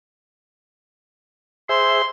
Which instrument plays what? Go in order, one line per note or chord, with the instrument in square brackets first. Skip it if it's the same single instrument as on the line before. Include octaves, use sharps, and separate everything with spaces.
[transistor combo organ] G#4 C5 E5 [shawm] C6